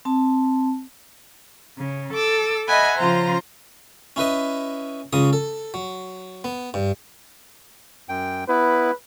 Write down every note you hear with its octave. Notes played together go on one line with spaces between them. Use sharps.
C4 A5
C#3
A4 D6 E6
D#5 E5 F#5 G#5 B5
C#3 F3 F4 C5 A#5
C#4 E4 B4 D#5
C#2 C#3 C#4 D#6
A4
F#3
B3
G2
F#2 G5
B3 E4 B4